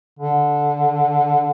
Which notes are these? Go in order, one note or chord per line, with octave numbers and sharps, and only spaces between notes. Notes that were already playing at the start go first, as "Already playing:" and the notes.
D3